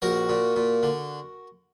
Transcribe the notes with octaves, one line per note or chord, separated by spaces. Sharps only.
A#1 F#4 A#4
A#2
A#2
D3